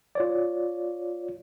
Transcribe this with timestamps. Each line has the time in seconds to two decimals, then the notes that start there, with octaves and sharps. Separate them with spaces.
0.15 F4 C#5 D5